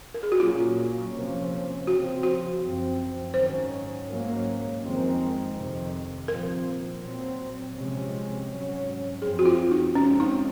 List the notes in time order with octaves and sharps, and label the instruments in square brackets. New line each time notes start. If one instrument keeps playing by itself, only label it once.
[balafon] A#4
G#4
F#4
[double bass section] A#2 F#3 A#3 C#4 [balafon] F4
[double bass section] C3 F3 A#3 C#4
[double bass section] C#3 F3 C4 [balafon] F#4
[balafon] F#4
[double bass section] F#2 F3 C4
[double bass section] G#2 D#3 F#3 C#4 [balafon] C5
[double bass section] G#2 F#3 A#3 C#4
F2 D#3 G#3 C4
F2 C3 D#3
[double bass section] A#2 F3 C4 [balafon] A#4
[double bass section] A#2 F#3 C4
C3 F3 G#3 C#4
G#2 F#3 C#4
[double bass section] F#2 F3 C4 [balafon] G#4
[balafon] F#4
F4
D#4
[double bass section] F2 C#3 G#3 C4 [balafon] C#4
[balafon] D#4